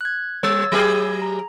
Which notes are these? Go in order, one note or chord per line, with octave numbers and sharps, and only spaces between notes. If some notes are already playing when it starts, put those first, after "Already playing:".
F#6 G#6
G3 C#5 E6 A6
F#3 G4 G#4
A#5